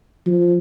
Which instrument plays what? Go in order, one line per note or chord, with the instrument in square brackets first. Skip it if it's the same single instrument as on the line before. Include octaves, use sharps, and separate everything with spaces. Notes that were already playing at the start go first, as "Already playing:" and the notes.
[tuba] F3